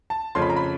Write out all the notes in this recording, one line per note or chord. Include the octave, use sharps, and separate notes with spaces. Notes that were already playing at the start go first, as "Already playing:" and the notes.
A5
F2 C#3 F3 A3 C#4 C6
B5
A#5
B5